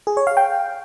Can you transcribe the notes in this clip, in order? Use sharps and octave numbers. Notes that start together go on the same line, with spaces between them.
G#4
C#5
F5
G5